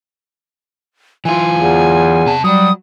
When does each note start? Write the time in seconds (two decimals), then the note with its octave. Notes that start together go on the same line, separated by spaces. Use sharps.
1.25 E3 F4 G#5
1.58 E2
2.27 C3 A5
2.44 F#3 G3 D#6